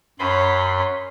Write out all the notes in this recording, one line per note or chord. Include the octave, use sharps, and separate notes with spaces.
F#2 C#4 B5 C6